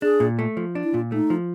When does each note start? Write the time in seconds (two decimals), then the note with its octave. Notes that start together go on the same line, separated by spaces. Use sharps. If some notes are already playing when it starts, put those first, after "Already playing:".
0.02 D4 G#4
0.20 A#2
0.39 A3
0.57 F3
0.75 D4
0.84 E4
0.94 A#2 F4
1.12 A3 D#4
1.30 F3